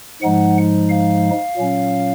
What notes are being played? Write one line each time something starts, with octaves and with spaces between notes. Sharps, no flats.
G#2 F3 G#3 D#4 F#5
F5
A#2 F#3 C#4